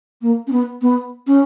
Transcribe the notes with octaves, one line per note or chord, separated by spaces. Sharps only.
A#3
C#4
B3
B3
C#4